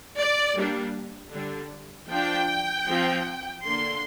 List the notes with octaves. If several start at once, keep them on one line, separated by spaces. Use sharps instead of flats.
D5
G3 A#3 D4
D3 G3 D4
F3 D4 G5
F3 C4
D3 A#3 D4 C6